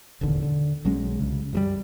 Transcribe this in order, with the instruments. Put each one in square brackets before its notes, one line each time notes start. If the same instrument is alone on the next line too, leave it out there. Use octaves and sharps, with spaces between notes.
[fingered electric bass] E1 A1 D#2 D3
D3
B1 F#3 G#3 C#4
C2 C#3
F#2 F#3 G3